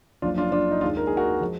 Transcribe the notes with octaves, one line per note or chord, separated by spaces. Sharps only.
F#1 F#2 F3 D4 F4
D4 F4
D4 F4
D#4
D#2 D#3 G#3 D4 F4
A#4
G#4
F#4 A#4
F3 G#3